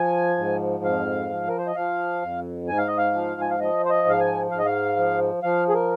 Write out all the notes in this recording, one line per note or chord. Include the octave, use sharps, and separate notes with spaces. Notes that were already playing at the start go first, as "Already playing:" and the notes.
Already playing: F3 G#5
G#2
F2 F5
F3
A#4
C5
D#5
F3 F5
F2
G#2 G#5
F5
D#5
F5
F3
G#5
F5
F3 D#5
C5
D#5
G#2 F5
G#5
G#2 F5
D#5
F5
F3
F3 F5
G#4
A#4